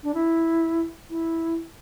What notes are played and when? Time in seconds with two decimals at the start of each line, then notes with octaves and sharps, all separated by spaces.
0.03 D4
0.14 E4
1.10 E4